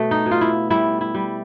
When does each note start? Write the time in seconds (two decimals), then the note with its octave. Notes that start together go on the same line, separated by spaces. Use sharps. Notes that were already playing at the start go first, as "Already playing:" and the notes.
Already playing: B2 A3
0.11 D#4
0.26 B2
0.31 F4
0.41 E4
0.70 G3 E4
1.01 E4
1.15 G3